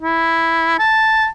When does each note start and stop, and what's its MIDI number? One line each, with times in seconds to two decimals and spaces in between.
0.01 0.74 64
0.79 1.27 81